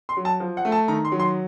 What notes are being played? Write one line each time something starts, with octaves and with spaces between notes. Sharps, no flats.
C6
F#3
A5
F3
F#5
A3
A5
D#3 A#5
C6
F#3
C6